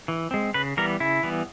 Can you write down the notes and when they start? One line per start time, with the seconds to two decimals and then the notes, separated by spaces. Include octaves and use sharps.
0.08 E3
0.31 G#3 C4
0.54 C#3 B4
0.77 E3 G3 B3 A#4
1.00 C#3 E4
1.23 E3 G3 B3